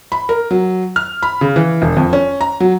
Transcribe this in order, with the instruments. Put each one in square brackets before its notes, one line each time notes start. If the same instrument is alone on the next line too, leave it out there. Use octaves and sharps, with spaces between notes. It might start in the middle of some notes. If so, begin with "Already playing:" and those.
[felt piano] B5
A#4
F#3
F6
B5
C#3
E3
E1
F2
C#4
A#5
F#3